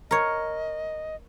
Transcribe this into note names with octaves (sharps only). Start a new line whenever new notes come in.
A#4 C#5 D#5